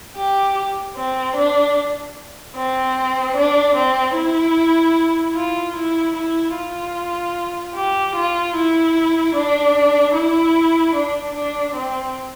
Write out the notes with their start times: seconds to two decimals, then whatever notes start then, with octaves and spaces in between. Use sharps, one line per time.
0.16 G4
0.96 C4
1.36 D4
2.56 C4
3.36 D4
3.75 C4
4.16 E4
5.35 F4
5.76 E4
6.16 E4
6.55 F4
7.75 G4
8.15 F4
8.56 E4
9.35 D4
10.15 E4
10.95 D4
11.35 D4
11.75 C4